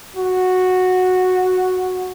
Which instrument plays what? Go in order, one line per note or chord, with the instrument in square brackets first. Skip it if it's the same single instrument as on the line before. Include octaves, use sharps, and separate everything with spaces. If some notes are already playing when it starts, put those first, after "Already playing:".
[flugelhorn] F#4